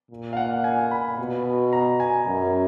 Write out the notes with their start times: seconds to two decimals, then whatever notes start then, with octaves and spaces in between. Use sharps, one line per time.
0.10 A#2
0.33 F5
0.37 F#5
0.64 G#5
0.91 B5
1.18 B2
1.73 A#5
2.00 G#5
2.27 F#2